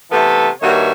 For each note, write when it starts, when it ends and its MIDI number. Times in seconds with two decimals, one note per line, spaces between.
0.11 0.49 48
0.11 0.49 52
0.11 0.49 57
0.11 0.49 59
0.11 0.49 69
0.61 0.92 43
0.61 0.92 51
0.61 0.92 58
0.61 0.92 66
0.61 0.92 73
0.61 0.92 76